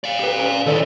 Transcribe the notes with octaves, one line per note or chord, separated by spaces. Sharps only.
D5 F5
G4 B4
C#4
D#3 E4 A4 D5